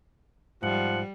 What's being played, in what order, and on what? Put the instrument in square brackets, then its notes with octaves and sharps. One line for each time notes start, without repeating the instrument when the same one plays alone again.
[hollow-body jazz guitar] G#2 [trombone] F3 [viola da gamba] G3 [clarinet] F#5